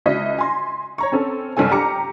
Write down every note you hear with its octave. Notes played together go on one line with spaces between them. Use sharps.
C#2 E4 F#4 D#5 B6
G#5 C6 A#6
C#5 A#5 C#6
C4 C#4 A4
F#1 C2 C#4 A4 G#5
G4 A#5 D6 C#7